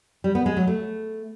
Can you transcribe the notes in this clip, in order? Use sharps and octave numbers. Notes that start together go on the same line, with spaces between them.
G3
B3
G#3
F#3
A3